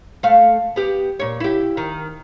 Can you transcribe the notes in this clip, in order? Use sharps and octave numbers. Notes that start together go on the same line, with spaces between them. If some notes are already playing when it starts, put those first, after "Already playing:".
A3 F5
B3 G4
A#2 C#5
E4 G4
D#3